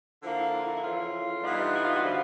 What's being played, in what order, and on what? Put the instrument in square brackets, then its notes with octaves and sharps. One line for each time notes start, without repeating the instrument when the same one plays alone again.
[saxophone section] D3 F3 A#3 E4
E4
F4
E4
E4
F2 C#3 E3 F4
G2 E3 G3 B3 D#4
E4
F4
F#4
D3 F3